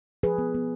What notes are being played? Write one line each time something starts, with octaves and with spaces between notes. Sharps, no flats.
F3 G#4 B4
B3
B3